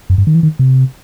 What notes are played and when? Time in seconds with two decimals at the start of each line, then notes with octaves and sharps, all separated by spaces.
0.10 F#2
0.18 G2
0.27 D#3
0.35 E3
0.43 D#3
0.59 C3